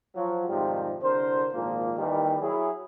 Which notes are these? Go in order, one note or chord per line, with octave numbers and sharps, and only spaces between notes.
F3 F#3
F2 G#2 C3 D#3 F3 G3
C2 D3 A#4 C5
G#1 A#2 F3 A#3
D#2 D#3 E3 G3
F#3 E4 G#4